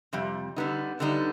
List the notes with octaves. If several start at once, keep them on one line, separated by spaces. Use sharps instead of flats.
F2 C3 G3
D3 G3 B3 D#4
D3 G3 B3 D#4